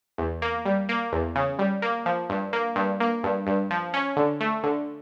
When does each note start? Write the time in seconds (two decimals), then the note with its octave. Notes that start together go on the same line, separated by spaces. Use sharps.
0.18 E2
0.42 A#3
0.65 G3
0.89 A#3
1.12 E2
1.36 C#3
1.59 G3
1.82 A#3
2.06 F3
2.30 G2
2.53 A#3
2.76 G2
3.00 A#3
3.23 G2
3.47 G2
3.70 F3
3.94 C#4
4.17 D3
4.40 A3
4.63 D3